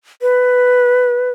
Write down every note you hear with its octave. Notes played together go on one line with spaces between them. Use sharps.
B4